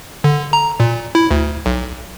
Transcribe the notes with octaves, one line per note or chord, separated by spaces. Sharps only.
D3
A#5
A#2
E4
D2
B1